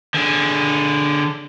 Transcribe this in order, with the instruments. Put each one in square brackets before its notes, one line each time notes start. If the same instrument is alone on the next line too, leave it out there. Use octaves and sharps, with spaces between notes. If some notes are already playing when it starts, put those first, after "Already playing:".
[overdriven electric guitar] D3 G#4